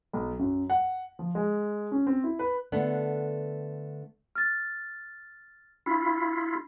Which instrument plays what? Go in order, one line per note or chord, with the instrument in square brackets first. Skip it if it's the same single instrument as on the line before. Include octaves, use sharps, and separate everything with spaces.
[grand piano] B1
F#2
F#5
F3
G#3
C#4
C4
E4
B4
[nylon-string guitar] D3 A3 B3 D4
[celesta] F6 A6
[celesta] D4 B5 [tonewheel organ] E4 F4